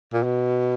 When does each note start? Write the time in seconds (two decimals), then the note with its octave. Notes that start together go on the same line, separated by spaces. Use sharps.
0.13 A#2
0.23 B2